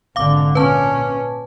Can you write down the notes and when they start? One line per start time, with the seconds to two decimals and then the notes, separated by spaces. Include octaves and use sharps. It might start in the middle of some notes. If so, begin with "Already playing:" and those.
0.16 G#1 D3 F5 D6
0.55 A#2 C#4 B4 A5